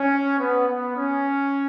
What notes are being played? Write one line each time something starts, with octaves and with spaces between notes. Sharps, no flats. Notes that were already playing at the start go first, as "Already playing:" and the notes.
Already playing: C#4
B3
B3
C#4